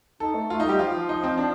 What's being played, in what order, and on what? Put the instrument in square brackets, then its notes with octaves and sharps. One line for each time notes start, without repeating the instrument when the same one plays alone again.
[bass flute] D#4 [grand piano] A4
[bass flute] A3
[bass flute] A3 [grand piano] F4
[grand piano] D#4
[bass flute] G3 [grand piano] G4
[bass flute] F3 [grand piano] F4
[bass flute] F3
[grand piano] D#4
C4
D4